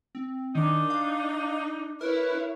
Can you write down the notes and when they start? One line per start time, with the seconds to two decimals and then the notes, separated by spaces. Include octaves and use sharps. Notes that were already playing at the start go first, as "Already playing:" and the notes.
0.15 C4
0.55 D#3 D4 D#4
0.90 F5
2.01 E4 A#4 B4 C#5